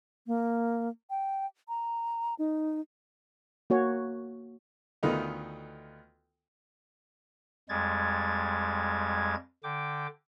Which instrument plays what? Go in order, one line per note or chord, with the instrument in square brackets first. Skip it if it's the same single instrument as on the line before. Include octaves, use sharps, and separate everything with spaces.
[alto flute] A#3
G5
A#5
D#4
[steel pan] A#3 F#4 C#5
[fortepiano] D2 D#3 A3 B3 D#4 F4
[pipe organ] F2 G3 G#3 G#6 A6
D3 G5 D6